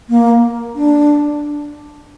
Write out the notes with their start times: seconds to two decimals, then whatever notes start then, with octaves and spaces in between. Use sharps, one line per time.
0.09 A#3
0.76 D4